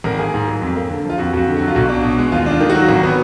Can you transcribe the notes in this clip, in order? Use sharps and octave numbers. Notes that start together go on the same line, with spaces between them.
G#1 A#4
A#3 G#4
G#2 G#4
F#3
F2
A#3
D3
F3 F4
F2 F#4
F2 F#4
D3
F#3 F#4
F4
B1 F#4
D4
B2
G#3
D#2 F4
D4 F4
D#3
F#4
F#3
G#1
B3